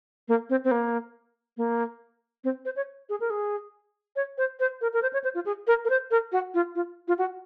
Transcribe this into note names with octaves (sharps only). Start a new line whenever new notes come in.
A#3
C4
C4
A#3
A#3
C4
C5
C#5
G#4
A#4
G#4
C#5
C5
C5
A#4
A#4
C5
C#5
C5
F4
G#4
A#4
A#4
C5
A#4
F#4
F4
F4
F4
F#4